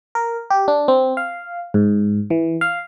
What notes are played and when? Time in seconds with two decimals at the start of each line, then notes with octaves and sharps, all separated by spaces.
0.15 A#4
0.50 G4
0.68 D4
0.88 C4
1.17 F5
1.74 G#2
2.30 E3
2.61 F5